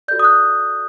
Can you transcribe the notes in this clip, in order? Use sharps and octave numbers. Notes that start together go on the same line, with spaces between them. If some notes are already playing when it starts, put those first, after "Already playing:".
F#4 A4 D5 G6
D#6
F#6